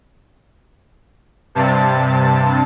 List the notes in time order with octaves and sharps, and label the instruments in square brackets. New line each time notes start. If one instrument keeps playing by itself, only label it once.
[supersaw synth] G2 C3 A5